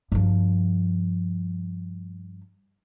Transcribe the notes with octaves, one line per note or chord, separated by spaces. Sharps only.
G2 F3